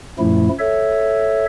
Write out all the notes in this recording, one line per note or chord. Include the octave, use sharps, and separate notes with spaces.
F#2 A#2 F3 A3 E4
A4 C#5 E5